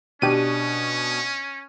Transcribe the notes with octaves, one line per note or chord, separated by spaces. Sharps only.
B2 C#4 D4 G4 D#7